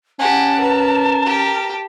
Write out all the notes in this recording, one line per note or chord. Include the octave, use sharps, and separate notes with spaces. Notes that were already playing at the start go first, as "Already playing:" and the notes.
C#4 G4 F#5 G#5 A5
A#4 B4
G4